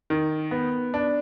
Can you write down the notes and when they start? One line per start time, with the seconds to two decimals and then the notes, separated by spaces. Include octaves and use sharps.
0.10 D#3
0.51 B3
0.94 D4